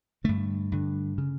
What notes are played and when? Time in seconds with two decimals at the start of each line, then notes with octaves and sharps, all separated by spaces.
0.24 G2 D3 A3
0.72 G2 D3
1.18 C#3